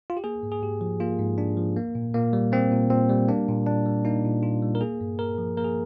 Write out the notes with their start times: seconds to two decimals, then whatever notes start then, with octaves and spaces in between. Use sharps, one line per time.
0.10 F4
0.17 G4
0.24 A#3 G#4
0.43 G#2
0.52 G#4
0.62 G#2 G4
0.81 F3
1.00 A#3 F4
1.19 G#2
1.38 G#2 D4
1.57 F3
1.77 A#3
1.95 A#2
2.14 A#2 A#3
2.33 G3
2.52 A#3 C4
2.72 A#2
2.90 A#2 C4
3.10 G3
3.28 A#3 D4
3.48 A#2
3.67 A#2 D4
3.86 G3
4.05 A#3 D#4
4.25 A#2
4.43 A#2 F4
4.62 G3
4.75 A#4
4.81 A#3 G#4
5.01 G2
5.19 G2 A#4
5.38 F3
5.57 A#3 A#4
5.65 G#4